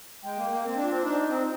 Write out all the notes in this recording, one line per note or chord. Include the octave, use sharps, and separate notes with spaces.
G#3 G5
A#3
A#3
C4
D4
F4
C4
D4 D#4
C4